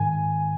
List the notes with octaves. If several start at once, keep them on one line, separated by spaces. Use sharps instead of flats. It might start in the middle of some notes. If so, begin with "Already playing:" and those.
Already playing: G#2 D#3 G#5